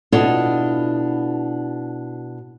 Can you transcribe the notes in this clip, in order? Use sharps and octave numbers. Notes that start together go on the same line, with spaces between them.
B2 D4 E4 F4 A4 D#5